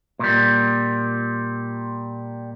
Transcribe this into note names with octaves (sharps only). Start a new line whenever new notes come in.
A#2 G3